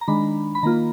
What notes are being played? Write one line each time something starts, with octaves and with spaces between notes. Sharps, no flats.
A#5
D#3 G#3 D4 B5
B5
D#3 A#3 F4 A#5